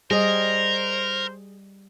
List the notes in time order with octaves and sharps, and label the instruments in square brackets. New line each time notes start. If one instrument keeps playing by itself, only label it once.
[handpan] G3 [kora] G#4 D#5 [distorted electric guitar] A#4 [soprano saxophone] C5